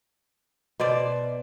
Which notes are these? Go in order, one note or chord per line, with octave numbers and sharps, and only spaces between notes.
B2 C5 D5